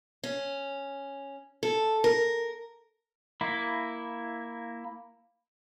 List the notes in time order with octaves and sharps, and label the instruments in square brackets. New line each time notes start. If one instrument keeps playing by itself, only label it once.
[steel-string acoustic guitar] C#4
A4
A#4
[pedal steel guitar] A#3 E4